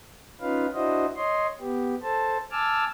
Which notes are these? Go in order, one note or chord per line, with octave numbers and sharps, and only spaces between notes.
C#4 D#4 F4 B4 F5
D4 E4 F#4 C5 D#5
C#5 D#5 C6
B3 G4
A4 C5 A5
G#5 A5 D6 E6 F6